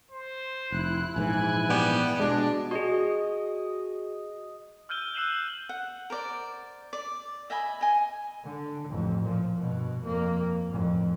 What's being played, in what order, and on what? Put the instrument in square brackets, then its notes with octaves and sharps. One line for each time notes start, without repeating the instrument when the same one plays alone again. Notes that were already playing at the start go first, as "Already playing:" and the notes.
[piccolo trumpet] C5
[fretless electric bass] F1 [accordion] E4 F#6
[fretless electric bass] A#1 G#2 E3 [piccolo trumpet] G#5
[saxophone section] G3 B3
[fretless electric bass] B2 G#3 [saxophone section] D4
[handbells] F#4 G#4 [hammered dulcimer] D#5
[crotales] E6 F6 G6 D#7 G7
E6 F#6 C7 D#7 E7 F#7
[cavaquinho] F#5
A#4 C5 D5
D5
D#5 E5 G#5 B5
D#5 G#5
[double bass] D3
A1 F2
A#2 F3
G2 B2
F2 A#3
A1 F2